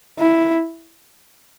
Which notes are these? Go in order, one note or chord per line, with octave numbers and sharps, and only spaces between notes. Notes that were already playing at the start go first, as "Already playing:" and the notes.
E4